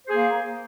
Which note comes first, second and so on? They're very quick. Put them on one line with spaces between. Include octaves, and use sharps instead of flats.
C5 G#4 A#3